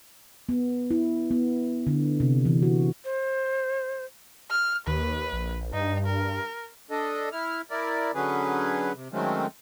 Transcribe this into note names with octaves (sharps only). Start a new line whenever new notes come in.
B3
E4
B3
D3
C3
E3
F#4
C5
F6
D#2 B4
A#1
G2 D#4
A#4
D4 A4 D#5
E4 F6
E4 A#4 D5
D3 F#3 C#4 G#4 B4
C3
D#3 F#3 G#3 A3 C4 C#4